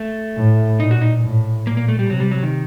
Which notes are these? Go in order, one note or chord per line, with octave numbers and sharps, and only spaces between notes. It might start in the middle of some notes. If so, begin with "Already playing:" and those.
Already playing: A3
A2
A#2 D#4
F#4
D#4
A2
A#2 A#3
A#3
A3
G3
C3 F#3
G3
F#3
D#3